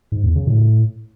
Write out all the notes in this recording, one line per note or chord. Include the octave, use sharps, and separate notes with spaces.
G#2
E2
C#3
A2